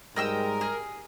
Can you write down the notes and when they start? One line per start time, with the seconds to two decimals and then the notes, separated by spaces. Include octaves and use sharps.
0.16 G#2 G3 G#3 A#4 D#5 G5 E6
0.61 G#4